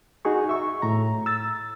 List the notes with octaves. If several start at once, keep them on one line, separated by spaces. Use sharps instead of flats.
D#4 F#4 G#4 C#6
E5 C#6
A2 A#5
E6 A6